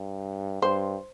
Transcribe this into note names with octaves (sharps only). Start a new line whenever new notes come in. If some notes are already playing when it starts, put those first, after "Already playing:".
Already playing: G2
G2 C5